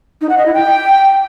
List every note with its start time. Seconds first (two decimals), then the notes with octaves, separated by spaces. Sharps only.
0.21 D#4
0.29 F#5
0.38 D#5
0.46 E4
0.54 G5